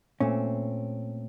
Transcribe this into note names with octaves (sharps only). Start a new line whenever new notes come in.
A#2 A3 C4 C#4